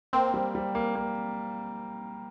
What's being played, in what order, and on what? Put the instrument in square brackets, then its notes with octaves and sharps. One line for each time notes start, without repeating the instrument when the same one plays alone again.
[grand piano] A#3 [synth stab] C4
[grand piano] G3
G3
A#3
A#3